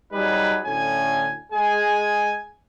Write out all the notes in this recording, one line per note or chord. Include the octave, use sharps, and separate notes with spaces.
F#3 G3 D#4 G#4 B4
D2 A2 C#4 G#5
G#3 G#4 G#5